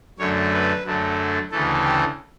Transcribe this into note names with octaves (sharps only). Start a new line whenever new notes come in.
F#2 D3 A3 C#5
B4
F#2 D3 F#3 A3
D2 C#3 E3 A3 A4
G4